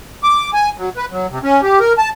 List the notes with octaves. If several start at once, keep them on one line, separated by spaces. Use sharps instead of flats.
D6
G#5
F#3
B4
F#3
C3
C#4
G4
A#4
A5